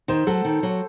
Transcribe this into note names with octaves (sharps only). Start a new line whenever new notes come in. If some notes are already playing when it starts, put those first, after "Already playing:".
D#3 C5
F#3 A4
D#3
F#3